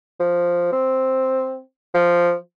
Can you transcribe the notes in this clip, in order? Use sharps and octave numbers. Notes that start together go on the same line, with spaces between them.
F3
C4
F3